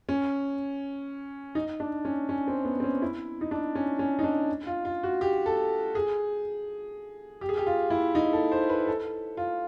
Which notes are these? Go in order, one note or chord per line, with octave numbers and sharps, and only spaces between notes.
C#4
D#4
D4
C#4
C#4
C4
B3
C4
C#4
E4
D#4
D4
C#4
C#4
D#4
D4
F4
F4
F#4
G4
A4
G#4
G4
G#4
G4
F4
E4
D#4
A4
C5
B4
A4
F4